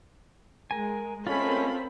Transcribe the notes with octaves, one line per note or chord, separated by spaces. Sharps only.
G#3 A#4 G#5
G#3 A3 C4 C#4 F4 A4 A#4 B5